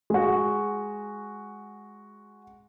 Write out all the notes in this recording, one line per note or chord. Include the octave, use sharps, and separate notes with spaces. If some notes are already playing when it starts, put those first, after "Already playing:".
G#3 F#4